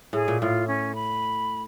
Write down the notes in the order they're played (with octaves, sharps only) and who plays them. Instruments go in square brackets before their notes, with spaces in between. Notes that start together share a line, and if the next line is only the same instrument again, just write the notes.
[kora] A2 [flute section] G#4
[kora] A#2
[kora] A2 [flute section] F4
[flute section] C#4
B5